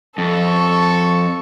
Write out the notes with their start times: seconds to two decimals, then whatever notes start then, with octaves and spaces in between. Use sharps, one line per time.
0.18 F2 A4 C#6